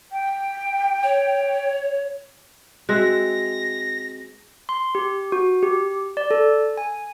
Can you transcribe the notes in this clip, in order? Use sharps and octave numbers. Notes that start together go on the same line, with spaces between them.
G5
C#5
G#3 C4 F#4 E5 F#6 A#6
C6
G4
F#4
G4
D5
A4
G#5